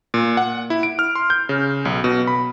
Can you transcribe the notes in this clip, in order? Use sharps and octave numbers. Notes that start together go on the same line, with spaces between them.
A#2
F#5
E4
D7
F6
C6
G6
C#3
B1
B2
B5